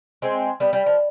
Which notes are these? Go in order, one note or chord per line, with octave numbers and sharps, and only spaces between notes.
G#3 C4
G3 B3
G3
F3